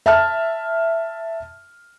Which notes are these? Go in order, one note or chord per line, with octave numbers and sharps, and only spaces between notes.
E5 A5 F6